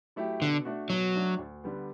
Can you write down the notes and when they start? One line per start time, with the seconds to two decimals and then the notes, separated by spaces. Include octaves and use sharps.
0.16 F#3 A3 E4 G4
0.41 B2 D3
0.65 A3 D4 F#4
0.90 B2 F#3
1.15 A3 D4 F#4
1.39 D2
1.64 D3 G3 B3